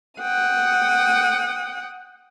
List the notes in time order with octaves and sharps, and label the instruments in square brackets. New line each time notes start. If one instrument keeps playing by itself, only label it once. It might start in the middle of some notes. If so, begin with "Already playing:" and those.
[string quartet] F#5 G5 D#6